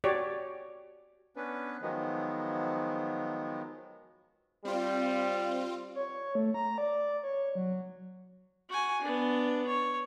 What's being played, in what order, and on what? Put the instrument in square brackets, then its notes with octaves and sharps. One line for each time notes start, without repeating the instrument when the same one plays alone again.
[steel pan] F#4 G4 C#5 D5
[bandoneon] B3 C#4 D4 B4
D#3 F3 F#3 G#3 B3
[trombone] G3 [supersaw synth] C4 F4
[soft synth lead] C#5
A3
A#5
D5
C#5
F#3
[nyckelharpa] F#4 G#5
B3 D4
C#5